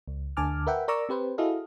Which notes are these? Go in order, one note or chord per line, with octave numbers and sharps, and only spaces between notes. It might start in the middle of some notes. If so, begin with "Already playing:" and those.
C#2
D2 D3 G#5 A5 D6 F6
A#4 B4 E5 F#5 G5
A#4 D5 A#5 C#6 D6 E6
C4 G4 B4 C5
E4 F#4 G#4 A4 D#5 F5